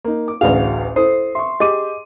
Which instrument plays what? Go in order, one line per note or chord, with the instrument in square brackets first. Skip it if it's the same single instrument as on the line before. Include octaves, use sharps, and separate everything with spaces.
[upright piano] A#3 D#4
[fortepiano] D6
[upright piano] A1 D2 F#4 [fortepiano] G#4 D5 [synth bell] F5
[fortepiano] E4 A4 [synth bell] C5 [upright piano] D#6
[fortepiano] E5 C#6 [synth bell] C6
[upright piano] G4 D#7 [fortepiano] G#4 [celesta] D#5 D6